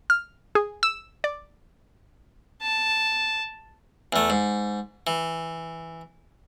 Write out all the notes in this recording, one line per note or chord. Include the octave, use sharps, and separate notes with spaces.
F6
G#4
E6
D5
A5
E2 A3
G#2
E3